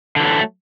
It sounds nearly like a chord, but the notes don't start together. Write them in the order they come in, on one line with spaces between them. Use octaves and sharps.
D3 E3 F#3 A3